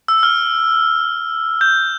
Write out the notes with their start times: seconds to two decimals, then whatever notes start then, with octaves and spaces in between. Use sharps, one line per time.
0.08 E6
0.23 F6
1.61 G6